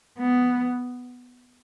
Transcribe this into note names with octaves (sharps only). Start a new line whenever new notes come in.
B3